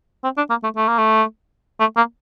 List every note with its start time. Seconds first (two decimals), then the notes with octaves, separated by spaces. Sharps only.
0.24 C4
0.37 D4
0.50 A#3
0.63 A3
0.76 A3
0.87 A#3
0.98 A3
1.80 A3
1.96 A#3